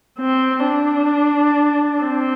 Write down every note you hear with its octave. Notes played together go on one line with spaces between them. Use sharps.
C4
D4
C4